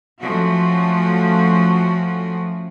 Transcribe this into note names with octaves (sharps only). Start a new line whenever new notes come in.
F3 A3 C#4 F#4